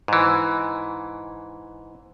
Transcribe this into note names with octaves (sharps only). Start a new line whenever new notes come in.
G#2 E3